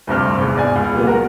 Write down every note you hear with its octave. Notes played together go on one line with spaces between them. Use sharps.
D2 G2 C3 F6
G#1 E2
E2 D5 G#5
C#2
A#2 G3 A#3 B3
F#4 A#4